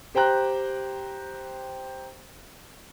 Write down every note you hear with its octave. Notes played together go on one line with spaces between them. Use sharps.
G4 C5 G5 A#5 F#6